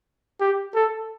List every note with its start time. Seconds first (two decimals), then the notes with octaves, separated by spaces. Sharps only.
0.40 G4
0.75 A4